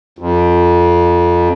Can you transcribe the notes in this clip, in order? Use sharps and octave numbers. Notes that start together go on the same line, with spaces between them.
F2